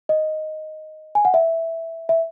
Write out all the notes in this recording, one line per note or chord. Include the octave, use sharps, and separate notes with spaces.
D#5
G#5
F#5
E5
E5